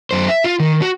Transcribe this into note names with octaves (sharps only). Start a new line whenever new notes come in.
F#2 C5
E5
F4
D#3
F#4